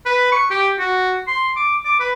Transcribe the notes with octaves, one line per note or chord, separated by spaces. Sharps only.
B4
C#6
G4
F#4
C6
D6
D6
B4